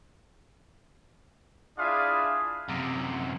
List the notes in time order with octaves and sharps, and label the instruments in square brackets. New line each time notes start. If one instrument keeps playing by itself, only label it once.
[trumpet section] D4 E4 F4 G#4 E5 F5
[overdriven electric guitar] F#2 C3